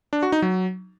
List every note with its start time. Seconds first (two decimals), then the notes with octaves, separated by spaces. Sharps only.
0.13 D4
0.23 F#4
0.32 D#4
0.42 F#3